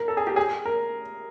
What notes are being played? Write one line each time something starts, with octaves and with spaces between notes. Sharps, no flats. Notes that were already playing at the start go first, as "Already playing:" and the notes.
Already playing: A#4
A4
G#4
G4
G#4
A#4